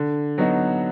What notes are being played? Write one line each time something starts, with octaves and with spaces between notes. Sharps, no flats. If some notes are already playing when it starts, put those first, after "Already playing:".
Already playing: D3
F#3 B3 D#4 F#4